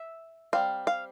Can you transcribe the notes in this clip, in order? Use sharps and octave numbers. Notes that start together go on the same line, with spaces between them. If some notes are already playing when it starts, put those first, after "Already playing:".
Already playing: E5
G3 C4 F5
F5